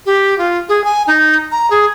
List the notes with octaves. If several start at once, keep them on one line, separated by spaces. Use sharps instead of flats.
G4
F4
G#4
G#5
D#4
A#5
G#4